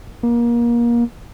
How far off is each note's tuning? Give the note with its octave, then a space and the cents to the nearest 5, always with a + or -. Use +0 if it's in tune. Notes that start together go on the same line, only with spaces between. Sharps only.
A#3 +25